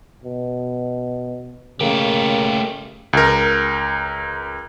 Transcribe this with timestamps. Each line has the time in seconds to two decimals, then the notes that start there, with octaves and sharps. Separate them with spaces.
0.24 B2
1.80 C#3 A3 A#3 G4
3.13 C#2 A#4